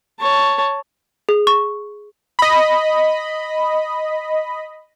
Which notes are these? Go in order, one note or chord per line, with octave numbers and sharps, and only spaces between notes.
C#5 A5
G#4
C#6
D#5 B5